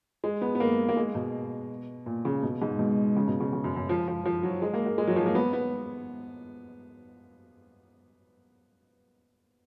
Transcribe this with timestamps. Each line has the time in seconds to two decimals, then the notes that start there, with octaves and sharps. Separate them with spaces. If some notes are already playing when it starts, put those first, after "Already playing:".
0.24 G#3
0.41 B3
0.55 B3
0.60 A#3
0.89 A#3
0.97 G#3
1.15 B2
2.06 A#2
2.25 C#3
2.43 B2
2.62 G#2
2.79 B2
3.16 C#3
3.27 B2
3.41 C#3
3.53 C#3
3.64 F#2
3.76 F#2
3.89 F3
4.08 F3
4.25 F3
4.43 F#3
4.62 G#3
4.74 A#3
4.86 A#3
4.98 G#3
5.07 F#3
5.16 F3
5.26 A#3
5.35 B3
5.53 B3